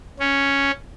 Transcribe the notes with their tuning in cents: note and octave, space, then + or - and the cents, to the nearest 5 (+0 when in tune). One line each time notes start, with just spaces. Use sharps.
C#4 +0